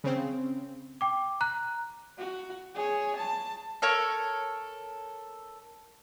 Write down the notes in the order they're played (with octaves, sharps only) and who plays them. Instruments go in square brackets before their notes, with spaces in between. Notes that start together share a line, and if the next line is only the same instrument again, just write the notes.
[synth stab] C#3 C4
[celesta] G5 D6
A#5 F#6
[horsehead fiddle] F#4
G#4 C#5
A5
[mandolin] A4 A#4 C#5